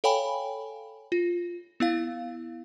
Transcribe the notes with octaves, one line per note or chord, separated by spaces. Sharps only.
A4 C#5 F5 G5 G#5 B5
F4
B3 E4 F5